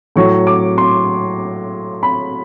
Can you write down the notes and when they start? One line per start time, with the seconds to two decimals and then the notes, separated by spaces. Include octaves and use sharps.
0.16 A2 F#3 C#6
0.47 D6
0.78 C6
2.03 B5